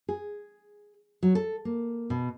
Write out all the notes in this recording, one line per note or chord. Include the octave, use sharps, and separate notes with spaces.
G#4
F#3
A4
A#3
B2